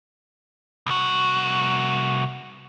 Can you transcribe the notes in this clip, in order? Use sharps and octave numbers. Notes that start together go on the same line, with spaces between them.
C2 F#4